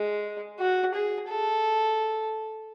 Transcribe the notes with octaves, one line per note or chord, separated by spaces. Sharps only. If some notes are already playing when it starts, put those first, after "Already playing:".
Already playing: G#3
F#4
G#4
A4